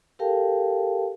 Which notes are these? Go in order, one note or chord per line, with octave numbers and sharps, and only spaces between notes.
G4 A4 A#4 F5 G5 A5